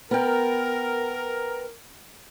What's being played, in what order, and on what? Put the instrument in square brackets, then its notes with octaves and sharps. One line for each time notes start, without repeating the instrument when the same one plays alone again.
[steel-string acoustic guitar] B3 G5 [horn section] A#4